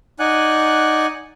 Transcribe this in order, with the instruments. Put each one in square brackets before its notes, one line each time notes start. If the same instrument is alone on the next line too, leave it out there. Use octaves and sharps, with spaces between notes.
[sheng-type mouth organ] D#4 D5 F#5 G#5 F#6